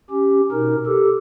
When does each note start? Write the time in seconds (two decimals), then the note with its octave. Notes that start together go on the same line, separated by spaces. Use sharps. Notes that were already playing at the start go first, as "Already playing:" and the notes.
0.10 C#4 G4
0.52 B2 D#4 A#4
0.86 G4 A4